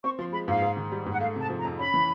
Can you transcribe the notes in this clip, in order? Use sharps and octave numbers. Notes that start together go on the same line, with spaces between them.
C4 C#6
F3 C6
G#3 B5
G#2 F5
G#2
D#3
G3
G#2
F#5
A3 F5
C3 A5
F3
A#5
F2
C#4 B5
E3